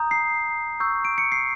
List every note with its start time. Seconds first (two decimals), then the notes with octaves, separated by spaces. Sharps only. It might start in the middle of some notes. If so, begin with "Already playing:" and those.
Already playing: A#5 D#6 G6
0.11 C7
0.80 C#6 E6 G6
1.05 D7
1.18 C#7
1.32 C7